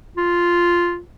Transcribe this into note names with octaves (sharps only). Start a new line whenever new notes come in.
F4